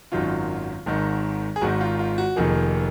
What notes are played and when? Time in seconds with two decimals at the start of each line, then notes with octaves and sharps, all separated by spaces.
0.12 G#1 F#2 D#3 F#3 F4
0.86 G#1 G#2 D#3
1.56 G#4
1.61 G#1 G#2 D#3 F#4
1.81 F4
1.99 F4
2.18 F#4
2.36 F1 F2 D#3 A#3 G#4